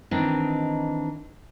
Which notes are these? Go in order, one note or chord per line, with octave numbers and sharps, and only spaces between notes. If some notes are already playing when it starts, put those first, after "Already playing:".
D#3 E3 C4 D4 D#4